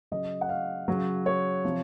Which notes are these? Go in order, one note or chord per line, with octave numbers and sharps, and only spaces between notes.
C#3 F#3 D#5
F#5
F5
C#3 F#3
C#5
C3 F3